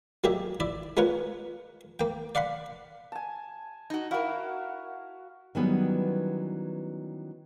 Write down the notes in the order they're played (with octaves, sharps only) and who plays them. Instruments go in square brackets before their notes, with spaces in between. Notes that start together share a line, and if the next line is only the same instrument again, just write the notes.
[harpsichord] F#3 A#3 G4 G#4 D#5 E5
E4 D5 E5
G#3 B3 F4 A#4 C#5 F#5
A#3 G5
D5 F5 F#5 B5 C6
[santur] G#5 A5
[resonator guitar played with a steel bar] D#4 F#4
[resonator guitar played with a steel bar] E4 A#4 [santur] F#4 F5
[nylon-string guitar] D#3 E3 F#3 G3 B3 C#4